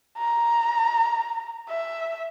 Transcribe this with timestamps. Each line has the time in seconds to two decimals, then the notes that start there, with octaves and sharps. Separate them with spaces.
0.18 A#5
1.68 E5